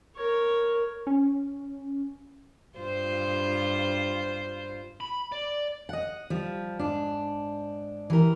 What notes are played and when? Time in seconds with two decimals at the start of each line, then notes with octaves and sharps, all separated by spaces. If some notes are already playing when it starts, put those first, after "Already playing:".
0.16 A#4 C#5
1.07 C#4
2.78 G2 F4 C5
5.00 B5
5.32 D5
5.89 D#5 F#5
6.30 F3 G3
6.79 G#2 D4
8.10 E3 G4 A#4